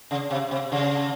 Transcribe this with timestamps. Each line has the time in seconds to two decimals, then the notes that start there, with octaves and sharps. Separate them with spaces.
0.11 C#3
0.31 C3
0.51 C3
0.72 C#3